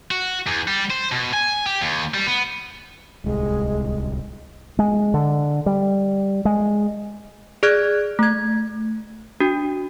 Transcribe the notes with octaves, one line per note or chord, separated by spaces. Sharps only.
F#4
E2
G3
C5
B2
G#5
G4
D#2
G3
B3
D1 C2 G#3
G#3
D3
G3
G#3
G#4 D5 F6 F#6 G#6
A3 G#6
D4 F#4